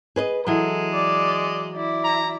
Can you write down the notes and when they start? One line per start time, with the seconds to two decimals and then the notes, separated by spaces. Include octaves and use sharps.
0.16 G#4 B4 D#5
0.47 E3 F#3 G#3 A4
0.92 D5
1.75 E4 D5
2.04 A#5